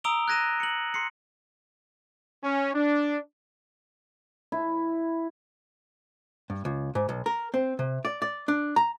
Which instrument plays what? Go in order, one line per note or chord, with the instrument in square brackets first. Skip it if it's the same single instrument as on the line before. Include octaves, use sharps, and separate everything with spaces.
[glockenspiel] A#5 D#6 E6 D7 F7 G7
F#6 G#6 A#6 D#7 E7
C#7 F#7
C6 C7 C#7
[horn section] C#4
D4
[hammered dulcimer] E4
[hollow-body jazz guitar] G2
C#2
G#2
B1
A#4
C4
C3
D5
D5
D4
A#5